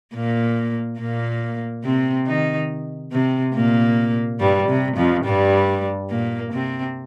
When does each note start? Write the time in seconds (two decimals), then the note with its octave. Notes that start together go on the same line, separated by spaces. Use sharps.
0.14 A#2 A#3
0.99 A#2 A#3
1.84 C3 C4
2.27 D#3 D#4
3.12 C3 C4
3.54 A#2 A#3
4.40 G2 G3
4.68 C3
4.97 F2 F3
5.25 G2 G3
6.10 A#2 A#3
6.52 C3 C4